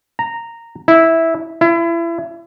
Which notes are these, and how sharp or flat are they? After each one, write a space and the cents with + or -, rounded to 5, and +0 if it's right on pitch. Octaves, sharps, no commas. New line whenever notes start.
A#5 -10
E4 -10
E4 +30